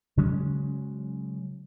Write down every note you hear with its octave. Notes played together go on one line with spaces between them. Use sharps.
C#3 F#3 G#3 C#4